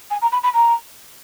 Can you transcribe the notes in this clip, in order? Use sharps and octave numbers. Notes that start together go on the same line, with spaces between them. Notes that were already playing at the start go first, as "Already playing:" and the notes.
G#5
A#5
B5
B5
A#5